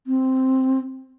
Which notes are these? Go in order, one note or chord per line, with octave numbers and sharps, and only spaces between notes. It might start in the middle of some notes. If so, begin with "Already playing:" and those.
C4